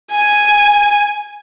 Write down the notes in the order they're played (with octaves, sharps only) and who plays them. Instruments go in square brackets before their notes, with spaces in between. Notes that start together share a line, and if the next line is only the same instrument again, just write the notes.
[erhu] G#5